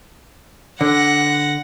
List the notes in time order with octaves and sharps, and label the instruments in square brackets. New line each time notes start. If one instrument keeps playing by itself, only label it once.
[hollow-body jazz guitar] D3 [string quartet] F#5 A#6